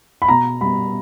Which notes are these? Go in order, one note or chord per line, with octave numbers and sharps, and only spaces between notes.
B5
B2 A#5
G3 B3 B5